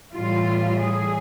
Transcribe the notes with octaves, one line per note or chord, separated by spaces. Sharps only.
A2 E3 G3 F4
G#4